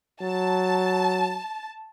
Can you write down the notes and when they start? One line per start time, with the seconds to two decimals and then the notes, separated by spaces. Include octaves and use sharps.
0.22 F#3 A5